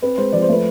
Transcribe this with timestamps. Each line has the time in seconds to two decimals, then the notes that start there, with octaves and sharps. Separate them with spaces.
0.02 C4 B4
0.18 G#3 C5
0.32 F3 D5
0.42 C5
0.49 A3 B4